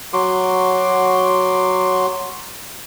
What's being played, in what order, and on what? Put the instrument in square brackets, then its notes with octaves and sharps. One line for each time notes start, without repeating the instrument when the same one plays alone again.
[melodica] F#3 F#4 C6 D6